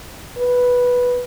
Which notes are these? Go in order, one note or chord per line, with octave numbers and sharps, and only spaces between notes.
B4